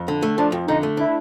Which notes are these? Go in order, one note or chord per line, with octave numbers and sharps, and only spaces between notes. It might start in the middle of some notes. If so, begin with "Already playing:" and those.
Already playing: F2
D3
A3
F3 D4
F2
D3 D#4
A3
D4 E4